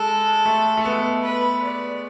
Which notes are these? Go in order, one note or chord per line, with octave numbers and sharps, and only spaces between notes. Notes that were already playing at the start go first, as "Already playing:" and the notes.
Already playing: G#3 A4
A3
A3
B3
B4
D5